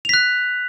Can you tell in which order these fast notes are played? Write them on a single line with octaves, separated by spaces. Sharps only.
F7 B6 F#6